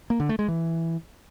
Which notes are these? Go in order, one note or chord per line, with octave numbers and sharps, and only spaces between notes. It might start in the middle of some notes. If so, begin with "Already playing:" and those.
A#3
D3
A3
G#3
E3